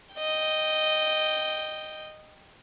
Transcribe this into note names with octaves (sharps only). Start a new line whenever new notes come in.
D#5 G5